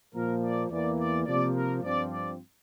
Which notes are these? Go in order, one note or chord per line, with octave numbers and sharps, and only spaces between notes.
A#2 F3 A#3 A#4
D5
E2 E3 A#3 D5
D5
C3 F3 A#3 D5
A#4
G2 F3 C4 D5
D5